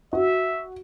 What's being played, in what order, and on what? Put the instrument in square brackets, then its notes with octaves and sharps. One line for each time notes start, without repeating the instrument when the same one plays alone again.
[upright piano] F#4 [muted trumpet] E5